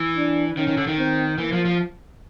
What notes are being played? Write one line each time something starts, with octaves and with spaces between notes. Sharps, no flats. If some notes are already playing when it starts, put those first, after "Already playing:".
Already playing: E3
D4
D#3 C#4
D#3
D3
D#3
C4
E3 A#3
F3
F3